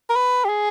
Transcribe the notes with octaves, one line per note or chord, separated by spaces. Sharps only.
A#4
B4
G4
G#4